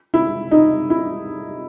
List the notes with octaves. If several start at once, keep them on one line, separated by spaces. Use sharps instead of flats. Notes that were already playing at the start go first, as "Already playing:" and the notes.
E4
D#4
E4